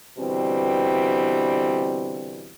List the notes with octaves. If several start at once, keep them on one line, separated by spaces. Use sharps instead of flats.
B2 D3 E3 G3 C4